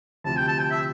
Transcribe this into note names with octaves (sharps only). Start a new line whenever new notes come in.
D2 C3 F3 C4 G4 A5
G5
A5
G5
E5